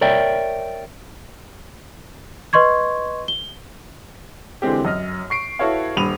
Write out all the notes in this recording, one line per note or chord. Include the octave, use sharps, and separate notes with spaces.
A#4 C#5 D5 E5 G5
B4 D#5 C6 C#6 G#6
G7
D3 E3 G#3 C4 G4
F#2 D#5 F6
C#6 C7 D7
E4 F#4 A4 B4 C#5 F5
D#1 G2 B5 D#7 F7